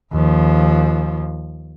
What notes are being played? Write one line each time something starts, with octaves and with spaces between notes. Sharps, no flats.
D#2 F3